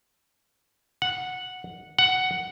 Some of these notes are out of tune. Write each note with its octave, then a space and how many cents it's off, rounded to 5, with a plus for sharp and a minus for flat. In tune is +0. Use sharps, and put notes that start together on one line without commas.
F#5 -10
F#5 +5